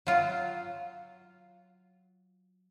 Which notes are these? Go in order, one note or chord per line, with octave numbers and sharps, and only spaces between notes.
F#3 F4